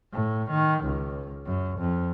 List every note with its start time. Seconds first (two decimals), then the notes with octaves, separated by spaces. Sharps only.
0.13 A2
0.51 D#3
0.85 C#2
1.46 F#2
1.80 F2